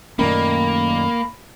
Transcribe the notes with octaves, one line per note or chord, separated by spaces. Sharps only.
F#2 A#2 D#3 A3 A#3 C#4 B5